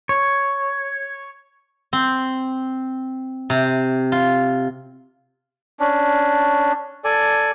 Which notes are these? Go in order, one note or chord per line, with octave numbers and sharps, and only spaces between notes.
C#5
C4
C3
F4
C#4 D4
A4 D5 G#5